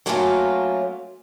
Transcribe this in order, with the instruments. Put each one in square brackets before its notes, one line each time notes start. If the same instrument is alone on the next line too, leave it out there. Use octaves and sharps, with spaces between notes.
[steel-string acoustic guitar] F#3 A3 A#3 C#4 F4 F#4